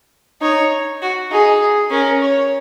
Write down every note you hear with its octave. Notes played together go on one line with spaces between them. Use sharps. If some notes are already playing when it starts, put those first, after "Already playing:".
D#4 C#5
F#4
D#4 G#4
C#4 A#4
C#5